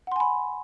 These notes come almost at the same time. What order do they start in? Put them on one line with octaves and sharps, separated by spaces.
F#5 C6 G#5 B5